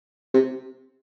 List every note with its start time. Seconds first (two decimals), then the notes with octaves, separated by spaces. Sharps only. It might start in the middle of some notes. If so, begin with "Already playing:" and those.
0.34 C3